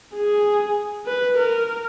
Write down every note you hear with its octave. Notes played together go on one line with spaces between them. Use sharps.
G#4
B4
A#4